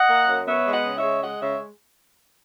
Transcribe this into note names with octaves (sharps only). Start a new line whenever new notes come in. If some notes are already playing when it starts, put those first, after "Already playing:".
Already playing: D#5 F#5
A#3
F#2
B3 C#5 E5
G#3
D#5 F#5
C#3
C#5 E5
G#3
G#3 D#5 F#5
C#3 C#5 E5